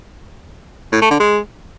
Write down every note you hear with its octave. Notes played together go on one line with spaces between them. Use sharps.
A2
A3
D3
G#3